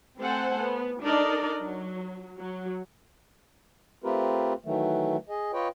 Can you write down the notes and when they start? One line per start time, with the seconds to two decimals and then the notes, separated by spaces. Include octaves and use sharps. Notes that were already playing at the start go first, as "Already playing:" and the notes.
0.19 A3 C4 A4 C5 F#5 G#5
0.59 B3
1.02 D4 D#4 A4 A#4 D5 D#5
1.60 F#3
2.38 F#3
4.04 A3 C4 F4 G4 A#4 B4
4.65 D#3 E3 F#3 A3
5.29 G#4 D#5
5.53 F4 B4 C#5 D#5 G5